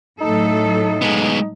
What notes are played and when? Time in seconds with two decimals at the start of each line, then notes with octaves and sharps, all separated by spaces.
0.21 A2 F#3 D#4 A4
1.02 G#3 B3